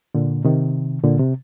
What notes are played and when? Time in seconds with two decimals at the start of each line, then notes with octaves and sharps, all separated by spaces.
0.15 A#2 D3
0.45 C3 D#3
1.04 A#2 D3
1.20 C3